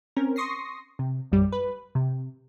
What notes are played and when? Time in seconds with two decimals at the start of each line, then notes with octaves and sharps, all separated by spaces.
0.16 C4 C#4 A#4
0.36 C6 C#6 D#6 A#6 C7
0.99 C3
1.32 A#1 F#2 G3
1.52 B4
1.95 C3